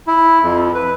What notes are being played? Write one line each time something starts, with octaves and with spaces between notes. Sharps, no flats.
E4
F2
B4